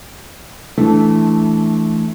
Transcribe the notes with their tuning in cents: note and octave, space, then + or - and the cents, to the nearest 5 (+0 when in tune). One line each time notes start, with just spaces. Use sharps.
E3 +0 A3 -15 D4 +0